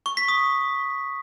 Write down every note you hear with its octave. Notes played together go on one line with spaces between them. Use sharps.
C#6
B6
D#6